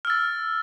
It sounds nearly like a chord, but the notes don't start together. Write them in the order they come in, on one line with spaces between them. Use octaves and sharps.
F6 E6 A6